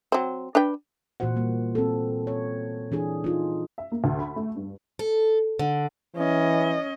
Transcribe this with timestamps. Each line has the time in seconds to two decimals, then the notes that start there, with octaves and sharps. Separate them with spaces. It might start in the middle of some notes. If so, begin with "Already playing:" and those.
0.12 F#3 C4
0.55 D4 B4 G5
1.20 A#2 E3 F#4 C5 F#5
1.36 G3 A#3
1.75 C4 A4
2.27 C#5
2.92 E3 D4 G#4
3.24 D#4 F4
3.78 E5
3.92 A#3
4.04 D2
4.19 B5
4.36 A3
4.56 G2
4.99 A4
5.59 D3
6.16 E3 C#4 D#5